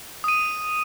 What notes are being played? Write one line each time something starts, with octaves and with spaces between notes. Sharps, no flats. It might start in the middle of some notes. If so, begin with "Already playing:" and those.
D#6 D#7